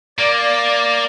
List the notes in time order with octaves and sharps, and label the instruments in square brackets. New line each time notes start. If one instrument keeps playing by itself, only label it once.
[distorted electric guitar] A#3 [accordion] D5